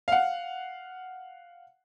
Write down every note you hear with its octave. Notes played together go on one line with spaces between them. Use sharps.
F5 F#5